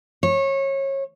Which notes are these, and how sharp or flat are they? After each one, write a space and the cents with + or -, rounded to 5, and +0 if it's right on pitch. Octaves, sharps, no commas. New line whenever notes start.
C#5 -25